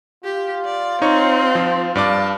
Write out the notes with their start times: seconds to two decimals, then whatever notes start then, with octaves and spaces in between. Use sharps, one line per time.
0.24 F4 G4
0.65 D5
1.02 C4 D#4 C#5 C#6
1.55 F3
1.95 G2 D5 F5 A5 D6